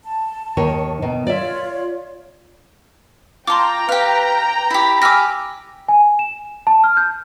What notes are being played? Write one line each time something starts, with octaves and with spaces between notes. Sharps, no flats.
A5
D#2 D#3 C#5
B2 D#3
F4 C#5 D5 E5
F4 G5 A5 A#5 C6 D6
G4 B4 F5
E4 G4 B5
G4 G#5 D6 E6 F6 A#6
G#5
E7
A5
F6
G6